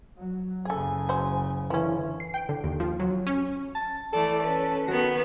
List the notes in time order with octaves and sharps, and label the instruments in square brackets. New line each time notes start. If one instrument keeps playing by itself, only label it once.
[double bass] F#3
[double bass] F#1 C#3 [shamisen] G#4 A4 [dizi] G#5
[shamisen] F#3 C5
[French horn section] D3 E3 [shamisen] F3 C#4
[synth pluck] C7
G5
D3
D#2
F3
F#3
C#4
[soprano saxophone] A5
[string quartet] E3 A3 D5 [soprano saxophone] A4
[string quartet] C#4 B4
[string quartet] D#3 B3 [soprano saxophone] F#4